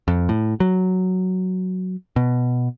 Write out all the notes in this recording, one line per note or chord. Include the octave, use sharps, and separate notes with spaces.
F2
A2
F#3
B2